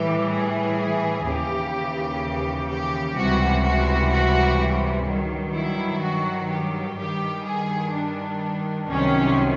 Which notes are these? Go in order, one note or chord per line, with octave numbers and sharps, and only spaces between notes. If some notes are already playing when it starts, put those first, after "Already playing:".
Already playing: A2 E3 G3 G4
G#4
D#2 C#3 E3 G4
G4
C#2 C3 E3 G3 F#4
F#4
F#4
G2 D#3 F#3
E4
F#4
G4
G2 D#3 G3 G4
G#4
D4
C2 C3 D#3 F#3 C#4